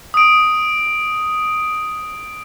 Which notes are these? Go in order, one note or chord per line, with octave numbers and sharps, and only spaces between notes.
D#6 D7